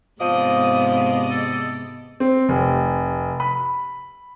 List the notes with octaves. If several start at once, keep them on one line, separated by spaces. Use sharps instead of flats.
G#2 C3 F3 B3 D5 D#5 D#6
A4
C4
F1
B5